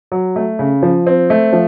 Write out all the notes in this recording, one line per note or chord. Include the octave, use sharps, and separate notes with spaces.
F#3
A3
C#3
F3
C4
A3
F3